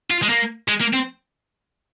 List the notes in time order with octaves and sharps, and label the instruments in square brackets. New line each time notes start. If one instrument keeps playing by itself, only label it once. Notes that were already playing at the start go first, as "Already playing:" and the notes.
[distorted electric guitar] F4
G#3
A#3
G#3
A#3
C4